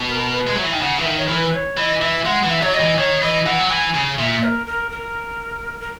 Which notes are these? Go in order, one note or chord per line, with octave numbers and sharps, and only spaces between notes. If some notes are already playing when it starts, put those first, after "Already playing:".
Already playing: B2
A#4
B4
G#3
F#3 E5
E3
D#3 G#5
C#3 F#5
E3 E5
D#3
C#5
E3 A#4
B4
C#5
E3 D#5
E3 E5
G#3 F#5
E3
E5
F#3 C#5
D#5
E3
D#3 C#5
E3 D#5
E3 F#5
F#3
E3 G#5
C#3
A#2 E5
A#4
A#4
A#4
A#4